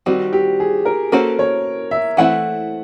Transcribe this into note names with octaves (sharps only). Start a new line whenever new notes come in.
D#3 G3 C4 F#4
G4
G#4
A#4
A#3 C#4 F#4 A4 A#4 C5
C#5
E5
E3 A3 C4 E4 F#5